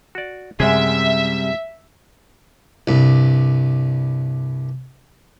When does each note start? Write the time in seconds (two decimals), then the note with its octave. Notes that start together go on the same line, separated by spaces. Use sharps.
0.15 F#4 D5
0.60 F#2 C3 G3 G#3 G#4 E5
2.87 C2 G2